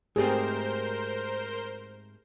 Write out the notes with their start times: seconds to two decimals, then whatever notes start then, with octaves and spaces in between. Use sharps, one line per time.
0.16 G#2 A3 C4 G4 G#4 A#4 C5 G6